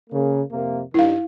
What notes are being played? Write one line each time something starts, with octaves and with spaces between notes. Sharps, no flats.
C#3 A#3
F2 C3 A#3
G2 D#3 E4 F5